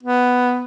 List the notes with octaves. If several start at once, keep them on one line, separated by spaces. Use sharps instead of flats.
B3